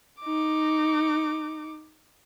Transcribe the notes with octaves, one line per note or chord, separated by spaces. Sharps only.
D#4 D6